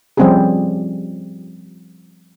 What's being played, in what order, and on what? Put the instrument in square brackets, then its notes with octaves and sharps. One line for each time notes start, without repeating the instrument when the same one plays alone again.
[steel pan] F3 G3 C4 C#4 G4 G#4